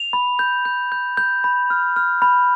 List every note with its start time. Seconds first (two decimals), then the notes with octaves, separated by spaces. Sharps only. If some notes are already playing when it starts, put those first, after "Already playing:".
Already playing: F7
0.13 B5
0.39 G6
0.65 G6
0.92 G6
1.17 G6
1.44 B5
1.70 F6
1.96 F6
2.22 B5